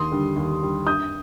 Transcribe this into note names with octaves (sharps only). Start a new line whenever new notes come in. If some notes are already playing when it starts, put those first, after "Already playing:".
Already playing: D#2 C6 D#6
D3 G3
D#2
D3 G3
G2 D#6 G6